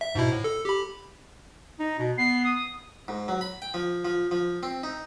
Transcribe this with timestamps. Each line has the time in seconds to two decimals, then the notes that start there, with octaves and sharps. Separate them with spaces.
0.01 E5
0.15 G#2 B2 E4
0.32 A2
0.44 A4
0.65 G4 B5
1.79 D#4
1.98 B2
2.18 B3 C7
2.44 D#6
3.08 G#2
3.28 F#3
3.41 B5
3.62 G5
3.74 F3
4.05 F3
4.31 F3
4.63 C4
4.83 D#4